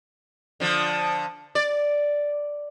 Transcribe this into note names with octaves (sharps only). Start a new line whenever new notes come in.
D3 F3
D5